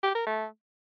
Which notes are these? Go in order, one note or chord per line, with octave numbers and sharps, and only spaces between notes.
G4
A#4
A3